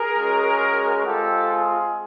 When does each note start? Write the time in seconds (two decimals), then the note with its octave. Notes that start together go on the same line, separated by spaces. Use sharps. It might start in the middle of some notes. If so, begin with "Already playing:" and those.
Already playing: G#4 A#4
0.16 G#3 C#4 F#4
1.05 G#3 C4 F4 G4 A4
1.50 G#4